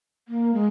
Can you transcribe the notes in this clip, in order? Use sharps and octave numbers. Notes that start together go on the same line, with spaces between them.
A#3
G#3